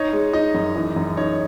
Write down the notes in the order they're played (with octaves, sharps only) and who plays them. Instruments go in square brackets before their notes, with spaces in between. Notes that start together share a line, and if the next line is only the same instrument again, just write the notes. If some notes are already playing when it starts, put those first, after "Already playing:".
Already playing: [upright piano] D#4 [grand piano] C#5
[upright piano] G#3
[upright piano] D#4 [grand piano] D#5
[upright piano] F#2
E3
F#2
[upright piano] D#4 [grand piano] C#5